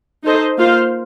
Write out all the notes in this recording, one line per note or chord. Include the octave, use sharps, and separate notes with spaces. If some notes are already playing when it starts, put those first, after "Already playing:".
D#4 A4 C5 D#5
A#3 F4 C5 F5